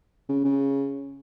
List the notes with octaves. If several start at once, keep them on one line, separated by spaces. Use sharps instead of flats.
C#3
C#3